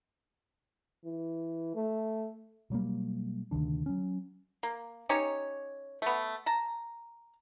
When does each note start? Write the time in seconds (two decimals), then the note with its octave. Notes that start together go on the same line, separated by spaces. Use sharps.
1.05 E3
1.75 A3
2.70 B2 F#3 G3 A#3
3.51 D2 C3 D#3 D4
3.86 F#3 C#4
4.63 A#3
5.09 C#4 D#4 G4 C#5
6.02 A3 B3
6.46 A5 A#5